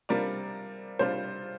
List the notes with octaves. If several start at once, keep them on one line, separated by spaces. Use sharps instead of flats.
C3 G3 D4 F4 A#4 D5
C3 G3 D4 F4 C5